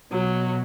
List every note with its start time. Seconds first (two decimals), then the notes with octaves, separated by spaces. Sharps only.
0.12 B2 F#3